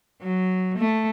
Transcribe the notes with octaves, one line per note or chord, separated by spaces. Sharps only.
F#3
A3